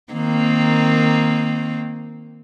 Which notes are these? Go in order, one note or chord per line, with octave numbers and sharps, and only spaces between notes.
D#3 A#3 C4